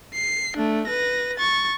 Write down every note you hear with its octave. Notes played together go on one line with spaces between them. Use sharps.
C7
A3 D4
B4 A#6
C#6 A6